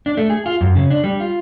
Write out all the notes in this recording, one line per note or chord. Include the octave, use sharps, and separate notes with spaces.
D4
A3
G#4
F4
F#2
C#3
D4
G3
F4